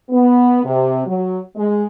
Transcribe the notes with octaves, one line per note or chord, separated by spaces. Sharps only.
B3
C3
F#3
G#3